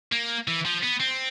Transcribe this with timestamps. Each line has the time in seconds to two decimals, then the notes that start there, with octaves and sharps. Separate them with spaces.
0.12 A#3
0.48 E3
0.65 F3
0.83 B3
1.00 C4